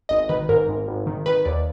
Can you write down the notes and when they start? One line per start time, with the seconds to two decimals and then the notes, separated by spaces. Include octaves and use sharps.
0.09 G#1 D#5
0.29 D#3 B4
0.49 G#2 A#4
0.68 G#1
0.87 G#1
1.07 D#3
1.26 D#3 B4
1.45 D#2 D5